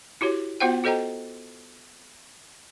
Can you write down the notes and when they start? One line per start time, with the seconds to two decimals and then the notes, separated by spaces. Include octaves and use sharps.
0.21 E4 F#4 G4 C#5
0.60 B3 F4 F#4 C5 F#5 G5
0.84 F#4 A4 C5 D#5 G5 A#5